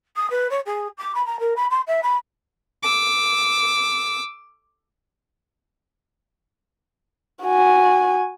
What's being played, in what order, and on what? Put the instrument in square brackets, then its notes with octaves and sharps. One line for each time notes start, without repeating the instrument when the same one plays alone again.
[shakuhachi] D#6
B4
C#5
G#4
D6
B5
A#5
A#4
B5
C6
E5
B5
[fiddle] D6 E6
[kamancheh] F#4 G#5